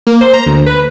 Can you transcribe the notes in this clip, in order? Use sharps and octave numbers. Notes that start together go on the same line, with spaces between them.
A#3
C5
A#5
D2
B4